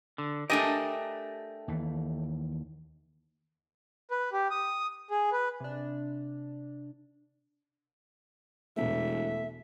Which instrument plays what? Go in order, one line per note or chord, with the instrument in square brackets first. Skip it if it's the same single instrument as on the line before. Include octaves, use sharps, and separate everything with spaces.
[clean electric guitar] D3
[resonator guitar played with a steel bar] A3 D4 D#5 [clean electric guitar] G4 A#4 G#5
[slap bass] D#2 E3
[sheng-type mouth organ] B4
G4
D#6
G#4
B4
[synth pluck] C3 D4
[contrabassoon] E1 [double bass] E2 B2 [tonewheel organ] A3 [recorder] E5